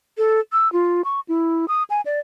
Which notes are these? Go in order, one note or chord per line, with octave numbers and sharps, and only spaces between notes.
A4
E6
F4
C#6
E4
D#6
G#5
D5